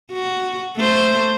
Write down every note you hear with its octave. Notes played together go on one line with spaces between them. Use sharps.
F#4
A3 C5